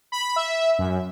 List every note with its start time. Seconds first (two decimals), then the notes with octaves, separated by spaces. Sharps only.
0.12 B5
0.36 E5
0.79 F#2